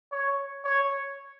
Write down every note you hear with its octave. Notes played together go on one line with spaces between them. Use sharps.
C#5
C#5